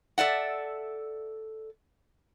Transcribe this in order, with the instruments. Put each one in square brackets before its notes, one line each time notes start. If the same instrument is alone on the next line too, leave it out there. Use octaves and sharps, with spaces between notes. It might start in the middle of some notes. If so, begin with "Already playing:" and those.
[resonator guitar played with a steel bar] A4 D5 E5 F#5